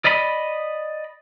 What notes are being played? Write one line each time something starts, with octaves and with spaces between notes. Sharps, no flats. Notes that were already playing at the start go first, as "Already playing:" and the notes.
D5 D#5 B5